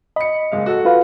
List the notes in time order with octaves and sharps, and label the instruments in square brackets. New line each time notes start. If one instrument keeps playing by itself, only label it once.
[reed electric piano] D#5 [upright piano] B5 C#7
[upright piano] F#1 G#3 F5
F#4 A4
[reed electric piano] F4 B4 F5